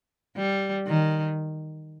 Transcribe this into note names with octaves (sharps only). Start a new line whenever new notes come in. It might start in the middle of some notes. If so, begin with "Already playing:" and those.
G3
D#3